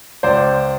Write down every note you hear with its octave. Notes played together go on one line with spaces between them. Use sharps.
C#2 C5 D5